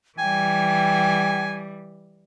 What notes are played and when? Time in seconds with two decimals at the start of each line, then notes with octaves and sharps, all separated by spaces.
0.18 E3 G3 G5 G#5